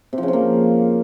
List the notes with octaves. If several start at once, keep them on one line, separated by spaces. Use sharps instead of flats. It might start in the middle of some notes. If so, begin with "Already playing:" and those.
C3
F3
C#3
F3
A#3